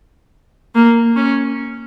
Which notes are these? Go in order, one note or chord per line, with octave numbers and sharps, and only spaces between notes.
A#3
C#4